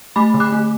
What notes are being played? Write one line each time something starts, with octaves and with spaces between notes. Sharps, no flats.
A3 B5 D6
D3
D6 F#6
A3